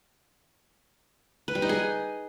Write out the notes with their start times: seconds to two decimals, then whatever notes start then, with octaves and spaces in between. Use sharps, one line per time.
1.48 B4
1.55 G3
1.62 D#4
1.69 G#4